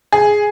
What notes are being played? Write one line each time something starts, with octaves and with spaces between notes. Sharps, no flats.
G#4